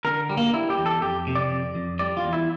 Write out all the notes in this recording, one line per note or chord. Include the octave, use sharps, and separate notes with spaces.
D3 A#4
G3
A#3
G3 E4
G4
E2
A4
F2 G4
C3
D5
F2
F2
G3 D5
F4
E2
E4